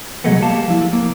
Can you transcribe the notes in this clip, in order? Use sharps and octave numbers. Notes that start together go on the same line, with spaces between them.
C2 F#3 G#3 A3 B3
G3 A#3 G4 F5 A5
F3 E4
A#3